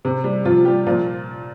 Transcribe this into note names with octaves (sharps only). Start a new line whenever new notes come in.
C3 C4
G3
C3 F3 F4
G3 G4
A#2 F3 F4